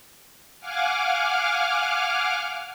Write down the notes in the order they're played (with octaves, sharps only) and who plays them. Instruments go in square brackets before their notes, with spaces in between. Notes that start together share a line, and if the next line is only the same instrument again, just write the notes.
[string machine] F5 F#5 G#5 D6 F6